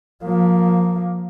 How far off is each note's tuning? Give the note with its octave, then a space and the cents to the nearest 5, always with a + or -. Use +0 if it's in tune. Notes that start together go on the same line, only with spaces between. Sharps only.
F3 +25 A#3 +0